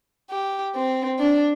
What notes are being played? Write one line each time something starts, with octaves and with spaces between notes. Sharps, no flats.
G4
C4
D4